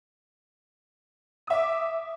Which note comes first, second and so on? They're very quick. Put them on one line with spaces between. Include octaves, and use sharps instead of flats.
D#6 E5 D6